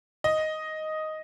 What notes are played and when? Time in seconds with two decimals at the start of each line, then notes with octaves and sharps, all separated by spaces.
0.24 D#5